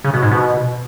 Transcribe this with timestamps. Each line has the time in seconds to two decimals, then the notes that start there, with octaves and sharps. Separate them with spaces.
0.04 C#3
0.13 B2
0.22 G#2
0.32 B2